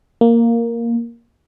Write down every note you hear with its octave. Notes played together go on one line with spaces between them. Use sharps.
A#3